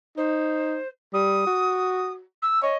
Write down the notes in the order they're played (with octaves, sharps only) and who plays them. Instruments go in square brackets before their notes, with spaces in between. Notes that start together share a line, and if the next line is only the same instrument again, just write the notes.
[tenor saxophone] D#4 [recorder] C5
[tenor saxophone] G3 [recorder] D#6
[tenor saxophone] F#4
[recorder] E6
[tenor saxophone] C#5 [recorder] D#5